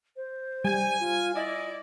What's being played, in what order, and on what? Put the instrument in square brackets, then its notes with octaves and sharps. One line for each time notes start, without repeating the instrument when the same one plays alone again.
[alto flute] C5
[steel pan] G3 [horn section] G#5
[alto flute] F4
[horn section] E4 D5 [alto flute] D#5